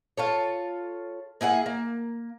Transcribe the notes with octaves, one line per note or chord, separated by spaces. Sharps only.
F4 A4 C#5
A#3 E4 G#4 F#5
A#3